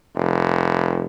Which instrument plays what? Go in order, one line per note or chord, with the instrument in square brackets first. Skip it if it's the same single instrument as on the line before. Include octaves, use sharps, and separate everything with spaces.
[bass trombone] F1